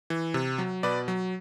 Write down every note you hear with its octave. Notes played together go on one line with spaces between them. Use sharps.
E3
C3
F#3
B2 B4 D5
F#3